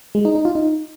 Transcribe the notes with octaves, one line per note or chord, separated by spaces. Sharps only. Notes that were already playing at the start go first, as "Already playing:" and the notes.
G#3
D#4
D#4
F4
D#4